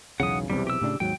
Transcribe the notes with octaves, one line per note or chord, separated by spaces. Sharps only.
B1 E2 C#3 F#5 D#6
B1 E2 C3 G3
G4 E6
A2 C#3 D4
D#2 G#2 F#3 G5